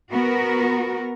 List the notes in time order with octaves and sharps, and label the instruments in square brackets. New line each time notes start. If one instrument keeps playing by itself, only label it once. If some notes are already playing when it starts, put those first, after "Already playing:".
[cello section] B3 F#4 A#4